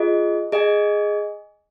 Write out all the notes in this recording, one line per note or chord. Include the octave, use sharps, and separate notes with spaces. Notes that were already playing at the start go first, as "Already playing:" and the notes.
Already playing: F4 G#4 D#5
G#4 D#5 G#5